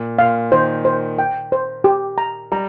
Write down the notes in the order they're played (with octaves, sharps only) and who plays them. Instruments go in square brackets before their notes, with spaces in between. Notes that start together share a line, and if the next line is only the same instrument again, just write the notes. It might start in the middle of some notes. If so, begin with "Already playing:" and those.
Already playing: [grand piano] A#2
[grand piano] A#2 [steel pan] F5
[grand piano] D#3 [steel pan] C5
[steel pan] C5
G5
C5
G4
A#5
[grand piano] G3 [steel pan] A#5